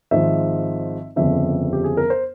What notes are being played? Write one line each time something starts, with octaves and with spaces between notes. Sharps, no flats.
G#1 G#2 F3 E5
G1 F2 C#3 F3 E5
G4
G#4
A#4
C5